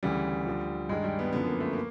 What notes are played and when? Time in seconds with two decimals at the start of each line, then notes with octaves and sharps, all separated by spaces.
0.03 D2 C#3 E3 G3
0.46 D2 D3 F3
0.89 G2 D#3 G#3
1.04 G3
1.19 B3
1.33 F#2 D3 F3 B3
1.47 A#3
1.60 A3
1.73 A#3